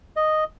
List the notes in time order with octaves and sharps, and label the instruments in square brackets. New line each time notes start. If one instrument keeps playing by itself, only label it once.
[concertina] D#5